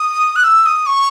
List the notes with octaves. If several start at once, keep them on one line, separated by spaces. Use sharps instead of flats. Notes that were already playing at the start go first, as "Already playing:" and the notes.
Already playing: D#6
F#6
E6
D#6
C#6